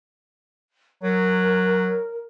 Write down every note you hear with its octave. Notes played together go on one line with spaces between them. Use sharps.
F#3 A#4